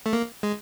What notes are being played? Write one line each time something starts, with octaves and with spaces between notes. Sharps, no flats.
A3
A#3
G#3